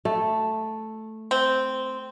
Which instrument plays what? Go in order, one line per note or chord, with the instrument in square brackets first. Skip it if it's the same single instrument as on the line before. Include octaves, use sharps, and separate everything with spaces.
[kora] A3
[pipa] C4